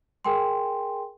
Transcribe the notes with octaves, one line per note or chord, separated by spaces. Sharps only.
G#4 A#4 G5 G#5 C6